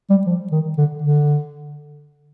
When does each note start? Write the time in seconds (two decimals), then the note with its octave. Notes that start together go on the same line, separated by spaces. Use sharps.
0.10 G3
0.26 F3
0.51 D#3
0.77 D3
1.02 D3